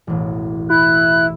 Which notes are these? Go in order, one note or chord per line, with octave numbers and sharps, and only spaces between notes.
E1 A1
E4 F#6